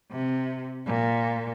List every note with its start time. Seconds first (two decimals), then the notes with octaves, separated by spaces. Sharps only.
0.11 C3
0.86 A#2